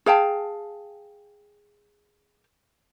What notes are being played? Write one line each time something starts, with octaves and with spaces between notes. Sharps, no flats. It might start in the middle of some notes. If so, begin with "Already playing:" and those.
G#4 F5 G5 A5